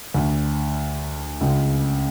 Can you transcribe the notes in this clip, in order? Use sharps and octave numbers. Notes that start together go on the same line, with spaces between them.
D2 D3
C#2 C#3